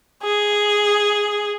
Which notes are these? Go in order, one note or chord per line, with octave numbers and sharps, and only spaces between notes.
G#4